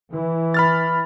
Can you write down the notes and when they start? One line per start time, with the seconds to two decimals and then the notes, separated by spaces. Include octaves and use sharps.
0.11 E3
0.54 B5 F6 A6